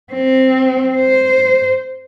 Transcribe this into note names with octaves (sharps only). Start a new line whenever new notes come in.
C4
C5